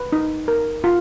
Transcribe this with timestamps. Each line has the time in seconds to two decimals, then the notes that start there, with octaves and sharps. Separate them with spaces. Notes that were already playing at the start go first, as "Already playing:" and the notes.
Already playing: B4
0.13 D#4
0.48 A#4
0.84 F4